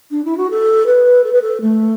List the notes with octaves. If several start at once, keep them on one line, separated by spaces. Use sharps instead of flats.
D4
E4
F#4
A4
B4
A4
B4
A4
A3